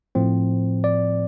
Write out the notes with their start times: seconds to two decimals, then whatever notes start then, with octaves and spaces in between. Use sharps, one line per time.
0.15 A2 F3 C4
0.84 D5